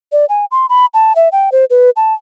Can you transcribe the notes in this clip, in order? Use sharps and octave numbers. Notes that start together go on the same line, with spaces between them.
D5
G#5
C6
B5
A5
E5
G5
C5
B4
A5